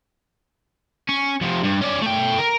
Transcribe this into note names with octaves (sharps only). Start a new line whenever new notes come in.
C#4
F2 C3
G2
C#4 D5
A3 G5
A#4